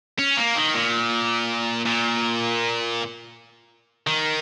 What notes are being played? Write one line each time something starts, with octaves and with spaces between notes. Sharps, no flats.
C#4
A#3
D#3
A#2
A#2
D#3